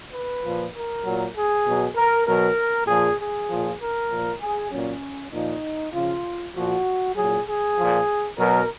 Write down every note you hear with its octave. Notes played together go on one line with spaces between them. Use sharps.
B4
A#2 F3
A#4
A#2 F#3
G#4
B2 F#3
A#4
B2 F#3 A#4
A#2 F3 G#4
G#4
A#2 F3
A#4
A#2 F3
G#4
A#2 F#3 C#4
A#2 F3 D#4
C#3 F3 F4
A#2 F3 F#4
A#2 F#3 G#4
G#4
A#2 F3
B2 F#3 A#4